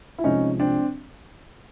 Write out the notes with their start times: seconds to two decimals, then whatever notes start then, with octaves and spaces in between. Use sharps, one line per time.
0.18 E4
0.24 C2 C3 F3 G#3 C#4 D#4
0.60 C4 D4